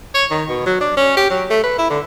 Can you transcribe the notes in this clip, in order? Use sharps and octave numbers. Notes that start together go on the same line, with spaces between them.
C#5
D#3
B2
F#3
D4
C#4
G4
F#3
A3
B4
E4
D3